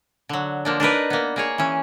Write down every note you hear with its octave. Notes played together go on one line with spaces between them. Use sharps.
D3 F#3
F3 A#3 D4
D4 D#4 A#4 B4
A#3 B3
A#3 G#4 C#5
E3 C#4